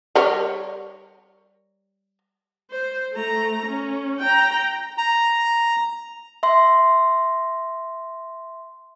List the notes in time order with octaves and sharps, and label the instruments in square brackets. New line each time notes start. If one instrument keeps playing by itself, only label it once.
[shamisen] G3 A#4 C#5
[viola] C5
A3 A#5
C#4
G5 A#5
[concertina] A#5
[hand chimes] E5 C6